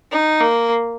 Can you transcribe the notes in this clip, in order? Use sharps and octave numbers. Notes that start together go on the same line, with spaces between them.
D#4
A#3